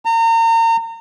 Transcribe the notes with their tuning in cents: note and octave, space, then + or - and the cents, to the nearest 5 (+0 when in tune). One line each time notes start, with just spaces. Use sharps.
A#5 -35